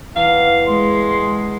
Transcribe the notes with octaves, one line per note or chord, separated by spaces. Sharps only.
E2 F5
G#3 C6